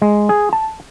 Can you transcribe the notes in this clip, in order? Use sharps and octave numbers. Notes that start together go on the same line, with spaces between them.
G#3
G#4
A5